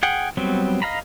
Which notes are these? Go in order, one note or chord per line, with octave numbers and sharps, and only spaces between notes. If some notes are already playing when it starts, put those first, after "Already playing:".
G#4 F#5 G5
F#3 G3 B3 C4
D#5 F5 A#5 B5